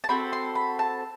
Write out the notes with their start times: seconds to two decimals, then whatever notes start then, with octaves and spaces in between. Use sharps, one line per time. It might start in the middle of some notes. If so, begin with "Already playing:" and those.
0.04 A5
0.09 C4 F#4 A4 B5
0.33 C6
0.55 B5
0.79 A5